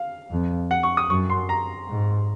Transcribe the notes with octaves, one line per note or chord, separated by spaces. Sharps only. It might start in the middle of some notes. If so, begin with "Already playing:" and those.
Already playing: F5
F2
F#5
C#6
D#6
F#2 C#6
C6
A#5
G#2